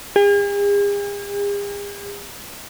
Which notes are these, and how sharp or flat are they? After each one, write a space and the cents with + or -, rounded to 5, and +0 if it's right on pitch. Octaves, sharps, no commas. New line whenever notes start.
G#4 -45